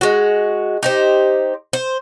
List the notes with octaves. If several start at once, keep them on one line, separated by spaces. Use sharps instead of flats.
G#3 F#4
D#4 G4 C5
C5